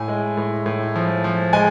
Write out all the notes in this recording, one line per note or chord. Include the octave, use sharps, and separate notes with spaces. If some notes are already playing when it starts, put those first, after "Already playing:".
Already playing: A2 G#5
G#3
A2
A2
F3
F3
G#3 G#5